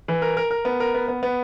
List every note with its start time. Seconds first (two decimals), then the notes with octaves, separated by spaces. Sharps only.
0.08 E3
0.22 A#4
0.37 A#4
0.51 A#4
0.65 B3
0.80 A#4
0.94 B3
1.08 B3
1.23 B3